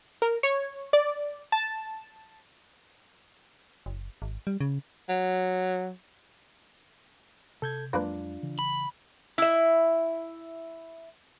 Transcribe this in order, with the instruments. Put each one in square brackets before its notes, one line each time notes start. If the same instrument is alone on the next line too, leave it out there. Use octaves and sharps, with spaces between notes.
[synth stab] A#4
C#5
D5
A5
[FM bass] F#1
G#1
G3
C#3
[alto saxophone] F#3
[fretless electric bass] C3 [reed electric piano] A4 G6 G#6
[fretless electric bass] F2 F#3 G#3 [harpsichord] A#3 B4 [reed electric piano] D4 F4
[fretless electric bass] C#3 E3
[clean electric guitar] B5
[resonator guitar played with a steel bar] E4 E5